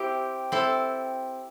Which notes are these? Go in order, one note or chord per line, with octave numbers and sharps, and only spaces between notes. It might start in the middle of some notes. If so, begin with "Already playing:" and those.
Already playing: C4 E4 G4
C4 E4 A4